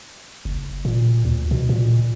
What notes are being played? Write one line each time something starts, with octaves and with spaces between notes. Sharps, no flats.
F#1
A#2
D2
B2
A#2